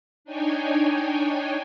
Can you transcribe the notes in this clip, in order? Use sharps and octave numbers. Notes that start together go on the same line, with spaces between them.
D4 D#4 C#5 G5 G#5